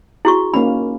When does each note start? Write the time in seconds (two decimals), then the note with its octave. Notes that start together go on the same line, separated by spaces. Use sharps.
0.25 E4 F#4 G#4 C#6
0.54 A#3 C#4 D#4 B5